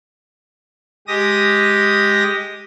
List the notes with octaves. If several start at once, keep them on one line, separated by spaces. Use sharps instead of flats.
G#3 G4 D#6 A#6